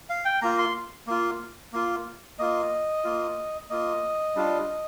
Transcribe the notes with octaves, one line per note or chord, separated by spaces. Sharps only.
F5
G5
A#3 F4 A#5
C6
A#3 F4
A#3 F4
A#3 F4 D#5
A#3 F4
A#3 F4 D#5
G3 D4 F4